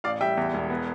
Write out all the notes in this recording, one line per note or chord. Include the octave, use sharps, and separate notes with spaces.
A1 D5 F5
G3 E5 G5
E2
E1
B3